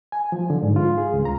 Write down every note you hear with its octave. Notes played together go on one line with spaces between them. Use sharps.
G#5
F3
D3
G#2
F4
G#4
C#2
A#5